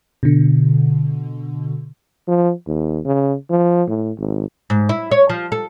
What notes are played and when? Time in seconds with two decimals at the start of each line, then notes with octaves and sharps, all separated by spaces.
0.23 B2 D3
2.28 F3
2.67 D#2
3.05 C#3
3.50 F3
3.89 A2
4.18 G#1
4.70 G#2
4.89 E4
5.11 C#5
5.29 F3
5.52 A4